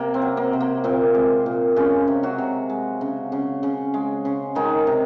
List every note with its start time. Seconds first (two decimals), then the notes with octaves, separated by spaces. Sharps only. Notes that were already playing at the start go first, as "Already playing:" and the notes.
Already playing: C3 A#3
0.14 C4
0.22 F#3
0.37 A#3
0.53 C3
0.60 A#3
0.84 A#2 C4
1.15 G#3
1.46 A#2
1.76 C#3 G#3 C#4
2.07 C3
2.23 F#3 F#4
2.38 C3
2.70 G#3
3.01 C#3
3.32 C#3
3.63 C#3
3.94 G#3
4.25 C#3
4.55 D#3 G#3 D#4
4.87 C3